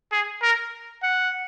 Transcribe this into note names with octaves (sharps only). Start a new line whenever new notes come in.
G#4
A#4
F#5